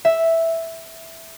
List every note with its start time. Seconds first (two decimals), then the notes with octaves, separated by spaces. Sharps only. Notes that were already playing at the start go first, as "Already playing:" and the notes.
0.05 E5